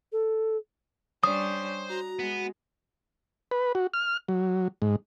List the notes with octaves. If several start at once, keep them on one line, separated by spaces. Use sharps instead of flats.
A4
G3 C#4 D4 C5 C#5 D#6
F#4 A#5
G#3 B3
B4
F#4
F6
F#3
G#2